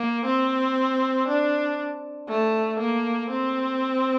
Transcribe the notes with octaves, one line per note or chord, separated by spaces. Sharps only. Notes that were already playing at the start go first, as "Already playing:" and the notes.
Already playing: A#3
C4
D4
A3
A#3
C4